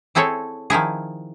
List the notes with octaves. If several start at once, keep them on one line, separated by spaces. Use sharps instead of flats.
C4 E4 G#4 A4 C#5
D#3 F3 E4 G#4